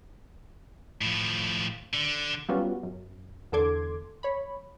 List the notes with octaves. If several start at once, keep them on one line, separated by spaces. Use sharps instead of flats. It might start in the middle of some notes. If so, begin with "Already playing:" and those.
A2 F3
D3
F#3 G3 B3 C#4 F4 F#4
F#2
E2 D3 A4 C6 D6 G#6
C#5 B5